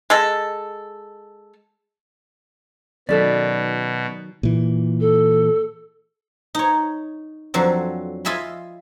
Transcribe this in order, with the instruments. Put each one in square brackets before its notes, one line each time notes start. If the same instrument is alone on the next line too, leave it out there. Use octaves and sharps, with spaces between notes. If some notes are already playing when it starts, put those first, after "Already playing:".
[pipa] G#3 A4
[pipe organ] B2 [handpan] D#3 F#3 D#4 [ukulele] C#4 A4 B4 [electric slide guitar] D5
[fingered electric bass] A#2 E3
[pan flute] A4
[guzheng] D#4 C#5
F2 D3 F#3 C4
F4 D#5 E5 G#5 B5